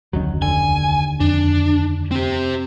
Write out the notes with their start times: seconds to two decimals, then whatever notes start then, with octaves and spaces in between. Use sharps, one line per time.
0.13 F1 D2 D#3 F#3 C#4
0.42 D#2 D3 G#5
1.20 F2 D4
2.11 C4 G4